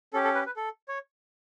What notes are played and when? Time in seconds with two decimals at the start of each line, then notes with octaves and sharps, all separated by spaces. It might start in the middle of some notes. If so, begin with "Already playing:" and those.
0.13 C#4 G4 A4
0.24 A4
0.35 B4
0.46 B4
0.56 A4
0.88 C#5